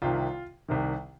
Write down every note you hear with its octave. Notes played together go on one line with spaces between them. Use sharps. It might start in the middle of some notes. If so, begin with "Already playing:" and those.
C2 C3 D#3 F4
C2 C3 D#3